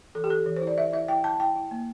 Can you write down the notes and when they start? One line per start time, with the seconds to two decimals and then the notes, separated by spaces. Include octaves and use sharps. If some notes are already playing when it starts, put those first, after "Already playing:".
0.15 E3 A4
0.24 G4
0.30 E3 A4
0.46 E3
0.56 E4 C5
0.67 D5
0.77 E4 E5
0.93 E4 E5
1.08 E4 G5
1.24 E4 A5
1.39 E4 G5
1.56 E4
1.71 A#3